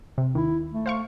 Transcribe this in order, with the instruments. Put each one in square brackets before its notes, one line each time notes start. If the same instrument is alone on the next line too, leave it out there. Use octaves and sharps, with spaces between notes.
[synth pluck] C3
[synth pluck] D#2 D#3 [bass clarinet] E4
[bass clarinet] A3
[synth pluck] C5 F5 C#6